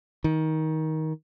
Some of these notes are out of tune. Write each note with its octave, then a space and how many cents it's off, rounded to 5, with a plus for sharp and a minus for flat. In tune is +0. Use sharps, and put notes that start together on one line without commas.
D#3 +20